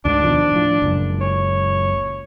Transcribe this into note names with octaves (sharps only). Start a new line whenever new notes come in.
D2 G#2 D3 D4
B2 D#3 F3
A2 F3
F#1 C#2 A#2
C#5